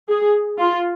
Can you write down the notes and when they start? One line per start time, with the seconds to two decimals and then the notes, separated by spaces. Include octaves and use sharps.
0.10 G#4
0.59 F4